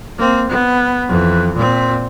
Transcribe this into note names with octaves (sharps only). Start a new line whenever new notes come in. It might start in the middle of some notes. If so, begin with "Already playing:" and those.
A#3 C4
B3
F2 E3
A#2 C4